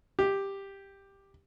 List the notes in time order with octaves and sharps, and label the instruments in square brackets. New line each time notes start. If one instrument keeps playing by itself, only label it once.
[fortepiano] G4